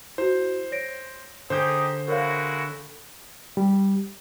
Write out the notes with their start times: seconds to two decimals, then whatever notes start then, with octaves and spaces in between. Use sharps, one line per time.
0.18 E4 F#4 C5
0.72 C#5 A#6 D7
1.50 D3 D#4 G4 G#4 C5 G6
2.08 G#3 E4 F#4 A#4 C#5 F5
3.57 G3